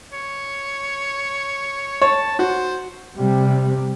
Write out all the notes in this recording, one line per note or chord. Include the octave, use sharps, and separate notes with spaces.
C#5
C#5 A5
F#4 C5
C3 G3